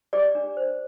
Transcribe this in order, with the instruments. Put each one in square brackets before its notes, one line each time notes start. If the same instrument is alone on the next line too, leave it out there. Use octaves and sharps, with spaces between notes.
[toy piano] G4 D5 D6
D4
C5